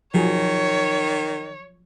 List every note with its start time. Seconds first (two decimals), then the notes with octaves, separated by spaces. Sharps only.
0.14 D#3 F3 F#3 G#4 C#5